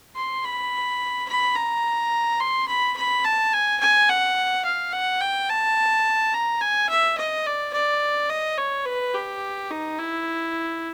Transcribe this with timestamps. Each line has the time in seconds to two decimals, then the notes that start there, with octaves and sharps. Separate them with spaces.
0.16 C6
0.44 B5
1.28 B5
1.56 A#5
2.40 C6
2.68 B5
2.97 B5
3.24 A5
3.53 G#5
3.80 G#5
4.09 F#5
4.65 F5
4.93 F#5
5.21 G5
5.49 A5
6.33 A#5
6.61 G#5
6.89 E5
7.18 D#5
7.46 D5
7.73 D5
8.29 D#5
8.58 C#5
8.85 B4
9.14 G4
9.70 D#4
9.99 E4